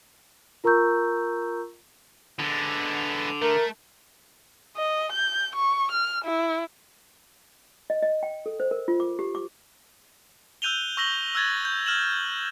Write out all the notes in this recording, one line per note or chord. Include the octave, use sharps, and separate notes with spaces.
F4 A#4 A#5 C#6 E6 G6
D3 G#3 B3
A3 A#4
D#5
G6
C#6
F6
E4
D#5
D#5
G5
A4
C5
A#4
F4
D6
G4
D6
E6 F#6 G6 D#7 F7 G7
C#6 E6 A#6 F#7 G7
E6 F#6 G#6 A6
G6
F6 E7 F#7